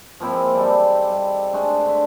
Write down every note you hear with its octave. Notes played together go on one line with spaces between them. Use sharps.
F3 A#3 C4 E4
G#3
G3 D#4 A4 D5
G3
G#3 A3 D4
D3 E5